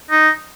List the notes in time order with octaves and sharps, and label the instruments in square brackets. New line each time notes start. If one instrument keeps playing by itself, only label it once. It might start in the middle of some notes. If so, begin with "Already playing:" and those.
[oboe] D#4